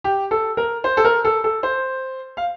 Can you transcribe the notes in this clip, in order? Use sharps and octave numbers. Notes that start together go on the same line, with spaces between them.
G4
A4
A#4
C5
A4
A#4
A4
A4
C5
F5